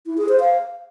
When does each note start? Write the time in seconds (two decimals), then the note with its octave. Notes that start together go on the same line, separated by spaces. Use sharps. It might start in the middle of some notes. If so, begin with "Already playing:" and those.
0.06 E4
0.18 G#4
0.29 C5
0.40 F5